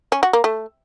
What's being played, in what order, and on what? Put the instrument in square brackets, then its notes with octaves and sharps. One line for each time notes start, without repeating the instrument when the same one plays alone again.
[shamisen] C#4
F#4
A#3
A3